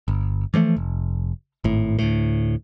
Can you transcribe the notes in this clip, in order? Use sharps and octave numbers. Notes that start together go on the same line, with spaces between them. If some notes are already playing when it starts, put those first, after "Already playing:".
G1
E3 F3 G#3 A3
F1
G#1 A2
D2 A2